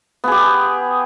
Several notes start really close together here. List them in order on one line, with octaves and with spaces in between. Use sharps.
B3 G#4 G4